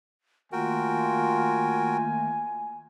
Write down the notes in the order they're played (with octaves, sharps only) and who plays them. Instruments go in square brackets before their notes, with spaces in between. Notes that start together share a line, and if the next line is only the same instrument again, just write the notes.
[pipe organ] D#3 A3 A#3 [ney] F4 [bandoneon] F#4 A#4 G5 [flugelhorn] G#5